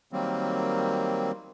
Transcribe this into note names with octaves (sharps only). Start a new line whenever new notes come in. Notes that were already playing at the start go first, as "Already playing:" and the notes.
D#3 F#3 G3 A#3 C4